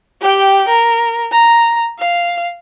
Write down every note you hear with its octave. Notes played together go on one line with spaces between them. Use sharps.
G4 G5
A#4
A#5
F5